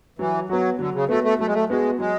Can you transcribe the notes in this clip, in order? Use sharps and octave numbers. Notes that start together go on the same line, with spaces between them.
E3 F#3
F#3 B3 F#4
D3 F#3
C#3
A3 B3 F#4
A3
F#3 A3
G#3
A3
G#3 B3 F#4
F#3 G#3